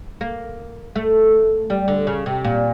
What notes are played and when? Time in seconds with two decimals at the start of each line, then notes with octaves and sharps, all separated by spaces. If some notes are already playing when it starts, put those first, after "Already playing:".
0.21 A#3
0.96 A3
1.70 G3
1.88 D3
2.07 C#3
2.26 C3
2.44 A#2